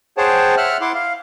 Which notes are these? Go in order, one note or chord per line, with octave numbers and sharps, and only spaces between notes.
G#4 C5 C#5 F#5 G5 A5
E5 F#5 F6 F#6
E4 F#5 C6 D6
F5